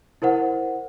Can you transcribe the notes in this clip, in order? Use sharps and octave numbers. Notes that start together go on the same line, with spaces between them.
E4 A#4 C5 F#5